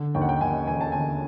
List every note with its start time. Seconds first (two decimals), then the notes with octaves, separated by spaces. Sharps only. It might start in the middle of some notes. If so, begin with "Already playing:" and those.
Already playing: D3
0.15 D#2 G5
0.21 F#5
0.29 G5
0.41 D#2 G#5
0.67 E1 G#5
0.81 A5
0.92 D3 G#5